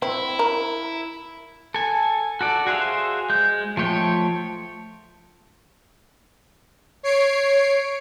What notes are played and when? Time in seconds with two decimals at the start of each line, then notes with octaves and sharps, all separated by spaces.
0.02 C4 E4
0.39 A#4
1.74 A4 G#5
2.41 F#4 A4 D5
2.67 F#4 G#4 C5 E5 F5
3.30 G#3 G6
3.77 F3 A3 C#5 G5
7.03 C#5 C7 D7